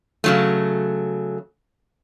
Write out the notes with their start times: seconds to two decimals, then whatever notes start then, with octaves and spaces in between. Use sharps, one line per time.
0.24 C#3 F#3 A3